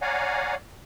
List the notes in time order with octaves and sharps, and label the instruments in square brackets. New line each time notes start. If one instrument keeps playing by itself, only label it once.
[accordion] C#5 D5 F5 F#5 G#5 A#5